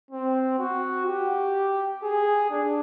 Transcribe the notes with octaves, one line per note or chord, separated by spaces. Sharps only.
C4
F#4
G4
G#4
D4